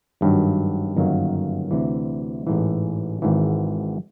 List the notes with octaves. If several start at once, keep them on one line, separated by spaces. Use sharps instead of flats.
G#1 G2 D#3 F#3
G1 F#2 D#3 F#3 A#3
D2 C3 E3
A1 G#2 E3
G#1 G#2 E3